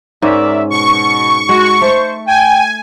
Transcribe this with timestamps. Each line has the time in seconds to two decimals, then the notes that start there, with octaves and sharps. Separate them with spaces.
0.22 G#2 C#4 A#4 D5 E5
0.70 B2 C#6
1.49 G#3 F#4
1.81 A3 C5
2.27 G5 G#5